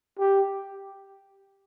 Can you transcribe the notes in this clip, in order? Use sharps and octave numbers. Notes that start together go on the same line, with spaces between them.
G4